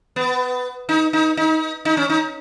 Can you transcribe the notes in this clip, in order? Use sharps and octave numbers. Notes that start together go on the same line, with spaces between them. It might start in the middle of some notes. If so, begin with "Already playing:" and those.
B3
D#4
D#4
D#4
D#4
C#4
D#4